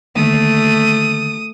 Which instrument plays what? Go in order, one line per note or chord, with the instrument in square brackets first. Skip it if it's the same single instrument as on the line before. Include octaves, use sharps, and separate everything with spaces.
[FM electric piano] D3 D#3 A#3 [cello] A3 [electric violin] D#6